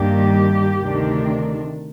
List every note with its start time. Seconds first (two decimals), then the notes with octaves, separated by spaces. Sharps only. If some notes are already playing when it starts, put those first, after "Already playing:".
Already playing: G2 D#3 G3 A#3 D4 G4
0.80 D2 C3 D#3 A3 D4